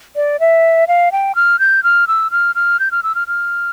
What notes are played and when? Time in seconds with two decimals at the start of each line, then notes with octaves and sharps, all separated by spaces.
0.16 D5
0.40 E5
0.88 F5
1.12 G5
1.35 F6
1.60 G6
1.83 F6
2.08 E6
2.31 F6
2.55 F6
2.80 G6
2.91 F6
3.03 E6
3.15 F6
3.28 F6